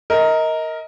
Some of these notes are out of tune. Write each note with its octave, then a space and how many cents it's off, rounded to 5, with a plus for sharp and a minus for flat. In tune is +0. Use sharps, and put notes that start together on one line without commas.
A#4 -5 D#5 +25